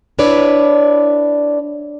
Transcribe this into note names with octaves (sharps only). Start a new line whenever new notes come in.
D4 E4 B4 C#5 D5